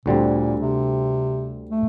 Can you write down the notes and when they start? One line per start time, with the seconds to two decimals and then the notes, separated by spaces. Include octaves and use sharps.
0.06 D2 A#2 D3 G3 C4
0.61 C3
1.71 A3